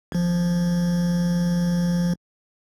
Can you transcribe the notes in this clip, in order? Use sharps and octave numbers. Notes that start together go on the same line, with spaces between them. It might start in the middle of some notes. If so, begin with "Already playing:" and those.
G#1 F3